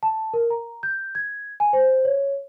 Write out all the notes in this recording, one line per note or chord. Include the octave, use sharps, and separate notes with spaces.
A5
A#4
A#5
G6
G#6
G#5
C5
C#5